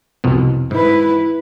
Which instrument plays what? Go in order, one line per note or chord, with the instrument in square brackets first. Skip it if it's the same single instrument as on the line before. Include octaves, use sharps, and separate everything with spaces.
[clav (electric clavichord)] C2 F2 B2
[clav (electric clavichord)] G#2 [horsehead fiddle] E4 B4